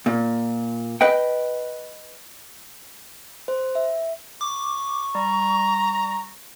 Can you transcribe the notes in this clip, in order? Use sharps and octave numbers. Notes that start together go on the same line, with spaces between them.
A#2
B4 D#5 G5
C5
E5
C#6 D6
G3 A#5